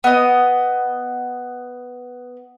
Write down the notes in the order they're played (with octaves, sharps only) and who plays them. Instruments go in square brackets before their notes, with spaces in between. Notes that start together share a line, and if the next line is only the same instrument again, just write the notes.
[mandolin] B3 D#5